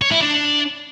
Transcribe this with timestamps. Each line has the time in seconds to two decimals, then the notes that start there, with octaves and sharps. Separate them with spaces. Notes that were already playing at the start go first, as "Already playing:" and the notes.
0.02 C#5
0.11 E4
0.21 D4